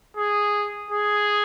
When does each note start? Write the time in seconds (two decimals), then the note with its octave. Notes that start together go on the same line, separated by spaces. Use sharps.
0.17 G#4
0.91 G#4